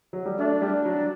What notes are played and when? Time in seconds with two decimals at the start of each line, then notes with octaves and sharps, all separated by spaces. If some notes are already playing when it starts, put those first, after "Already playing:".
0.13 F#3
0.25 G3
0.39 A3 D4
0.62 G3
0.85 F#3